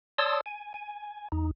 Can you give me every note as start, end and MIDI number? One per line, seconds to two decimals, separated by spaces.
0.18 0.41 73
0.18 0.41 74
0.18 0.41 81
0.18 0.41 84
0.18 0.41 87
0.18 0.41 88
0.46 0.73 80
0.74 1.28 80
1.32 1.51 40
1.32 1.51 63